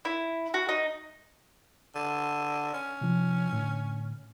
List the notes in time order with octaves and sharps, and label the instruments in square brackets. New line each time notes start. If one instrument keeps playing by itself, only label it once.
[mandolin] E4
F#4
D#4
[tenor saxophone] D3
C#4
[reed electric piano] C3 F3
A2 D3